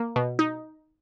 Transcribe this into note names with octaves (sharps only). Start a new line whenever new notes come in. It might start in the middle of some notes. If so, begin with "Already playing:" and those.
Already playing: A#3
B2
D#4